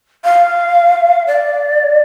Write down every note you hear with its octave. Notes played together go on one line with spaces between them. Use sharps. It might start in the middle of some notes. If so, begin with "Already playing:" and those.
F5
D5